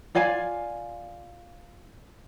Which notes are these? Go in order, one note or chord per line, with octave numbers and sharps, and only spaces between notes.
F4 D5 F5 G#5